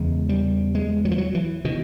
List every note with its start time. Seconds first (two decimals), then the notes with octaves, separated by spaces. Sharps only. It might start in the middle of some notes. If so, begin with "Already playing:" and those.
Already playing: E2 C#3 G#3
0.29 G3
0.75 G#3
1.05 F#3
1.11 F3
1.18 F#3
1.35 E3
1.64 B2 D#3